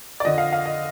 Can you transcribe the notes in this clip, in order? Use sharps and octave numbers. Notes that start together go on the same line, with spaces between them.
D5
F2 D3 F3 D#5
F5
F5
D#5